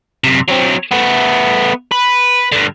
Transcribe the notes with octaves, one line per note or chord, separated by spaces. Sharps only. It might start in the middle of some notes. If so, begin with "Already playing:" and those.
F#2 C3
F#3 C4
A3 B3
B4
G2 D3